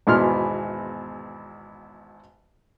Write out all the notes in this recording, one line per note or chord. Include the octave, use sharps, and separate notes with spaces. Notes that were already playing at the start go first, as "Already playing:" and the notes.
G#1 E2 B2 E4 C6 F6